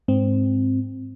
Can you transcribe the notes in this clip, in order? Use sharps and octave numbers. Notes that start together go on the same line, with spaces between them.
G#2 C4